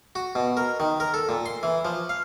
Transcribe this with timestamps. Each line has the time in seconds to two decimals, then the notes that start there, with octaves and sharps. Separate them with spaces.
0.15 F#4
0.35 B2
0.57 A#4
0.80 D#3
1.00 A#4
1.14 A4
1.29 A#2
1.46 C6
1.63 E3
1.85 F3
2.09 F5